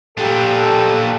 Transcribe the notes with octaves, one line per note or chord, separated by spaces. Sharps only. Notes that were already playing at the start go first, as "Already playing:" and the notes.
A#2 D4 G4 A4